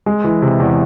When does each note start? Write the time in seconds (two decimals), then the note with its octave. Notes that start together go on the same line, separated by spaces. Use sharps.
0.06 G#3
0.24 E3
0.42 C3
0.60 E2